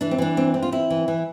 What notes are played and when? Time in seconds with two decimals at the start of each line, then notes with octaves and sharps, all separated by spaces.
0.01 E3 D4
0.11 C4
0.18 E3 D4
0.37 C4
0.54 C4
0.63 F4
0.72 C4 E4
0.90 E3
1.08 E3